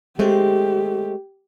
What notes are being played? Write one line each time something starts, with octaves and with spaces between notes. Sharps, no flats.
G#3 A3 C4 G4